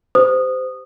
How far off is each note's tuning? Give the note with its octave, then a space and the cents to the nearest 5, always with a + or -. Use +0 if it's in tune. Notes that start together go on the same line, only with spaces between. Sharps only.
G4 +0 C5 -25 D#6 -15